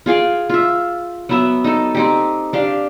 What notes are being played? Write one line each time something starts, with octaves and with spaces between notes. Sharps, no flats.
F4 G#4 F5 G5
F4 E5
F#3 B3 E5
D#4 A4
C4 D#4 G4
D4 G4 F5